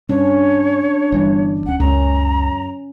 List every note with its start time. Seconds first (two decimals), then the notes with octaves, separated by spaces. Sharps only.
0.09 G2 C#4 D4 C#5
1.12 G1 E3 G3
1.66 D1 C#4 F#5
1.80 C#2 F#2 C#4 A#5